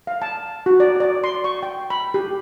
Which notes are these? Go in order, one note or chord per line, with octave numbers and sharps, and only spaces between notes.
F5
A5
F#4
D5
D5
C6
C#6
G5
B5
G4